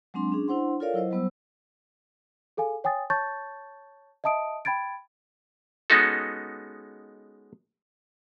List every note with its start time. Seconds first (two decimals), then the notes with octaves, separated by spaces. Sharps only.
0.14 F#3 G#3 C4 D4 C6
0.32 C#4 D4 G#4
0.48 D4 E4 C5 F#5 C6
0.80 F4 A4 A#4 C#5 D5 F5
0.94 F#3 E4 C5 D#5
1.11 F#3 G3 B3 C5 E6
2.57 G#4 A4 F5 G#5
2.84 C#5 G5 G#5 D#6 A6
3.10 C#5 A5 C#6 G6 A6
4.24 D#5 E5 A5 D#6 D7
4.65 G5 B5 G#6 A6 D7
5.90 G#3 B3 C#4 D#4 F#4 A4